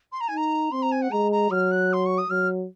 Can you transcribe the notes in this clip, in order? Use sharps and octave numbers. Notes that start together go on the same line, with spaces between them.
C6
A#5
G#5
D#4
A#5
C4 C6
A#5
G#5
F#5
G#3 A#5
A#5
F#3 F6
F#6
C6
C#6
D#6
F#3 F6